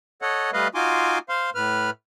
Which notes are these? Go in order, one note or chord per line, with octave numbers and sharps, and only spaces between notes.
A4 C#5 D#5 F#5
G3 A3 B4 D#5 F5
D#4 F4 F#4 G#5 C6 D6
C5 F5 C6
A2 B4 F6